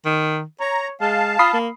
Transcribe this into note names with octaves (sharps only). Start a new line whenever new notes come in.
D#3
C#5 A#5
G#3 F5 A5
F4 B5 D#6 C7
A#3